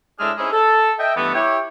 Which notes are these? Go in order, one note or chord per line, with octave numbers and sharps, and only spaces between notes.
A2 G#3 D4 G#4 E5 F6
C4 C#4 D#4 E4 G#4
A4
D#5 E5 G5
G2 E3 A3 B3
E4 G4 C#5